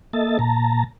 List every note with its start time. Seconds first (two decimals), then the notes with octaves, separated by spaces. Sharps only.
0.13 A#3 A4 D#5 E5 A6
0.39 A#2 A5 A#5